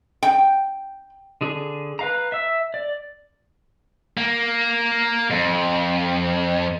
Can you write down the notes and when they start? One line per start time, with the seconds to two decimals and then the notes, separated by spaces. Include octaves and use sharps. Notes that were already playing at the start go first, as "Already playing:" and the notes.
0.23 G5
1.41 D3 G#4
1.99 B4 F5 A#5
2.32 E5 E6
2.74 D5
4.17 A#3
5.30 F2